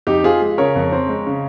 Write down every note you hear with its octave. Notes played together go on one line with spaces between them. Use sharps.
F2 D#4 G4
C4 F4 G#4
G#3
C#3 A#4 C#5
F2
C4
G#3
C#3